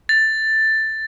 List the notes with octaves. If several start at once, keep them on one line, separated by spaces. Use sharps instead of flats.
A6